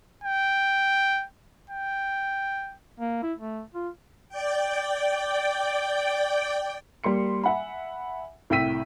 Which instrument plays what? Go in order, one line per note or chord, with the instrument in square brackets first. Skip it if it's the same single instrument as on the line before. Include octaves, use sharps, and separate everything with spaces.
[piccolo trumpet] G5
G5
[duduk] A#3
E4
A3
F4
[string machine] D5 G5
[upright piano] G3 A#3 C6 C#7
E5 F#5 G#5 B5
C2 A2 G5 E6 B6 D#7